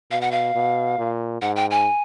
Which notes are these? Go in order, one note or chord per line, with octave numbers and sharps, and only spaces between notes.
B2 F5
F#5
F5
B2
A#2
G#2 F#5
G5
G#5